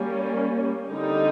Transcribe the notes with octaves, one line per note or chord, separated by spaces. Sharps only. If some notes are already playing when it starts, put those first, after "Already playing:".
Already playing: G3 A#3 C#4
D3 G3 C4 D#4